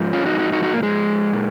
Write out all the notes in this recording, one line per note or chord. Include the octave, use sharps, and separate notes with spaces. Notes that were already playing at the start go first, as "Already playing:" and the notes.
Already playing: G#2 F3
C#4 F4
D#4 F#4
D#4 F#4
D#4 F#4
D#4 F#4
A#3
G#3
A#2